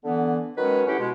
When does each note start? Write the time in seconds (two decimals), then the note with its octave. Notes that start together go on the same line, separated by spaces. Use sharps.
0.04 D3 E3 B3
0.58 D#3 F#3 G#3 C#4 B4
0.87 A2 C#4 E4 G4 F#5
0.99 B2 G#3